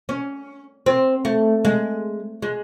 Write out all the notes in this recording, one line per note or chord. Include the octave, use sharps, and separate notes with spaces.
C#4
C4
A3
G#3
G#3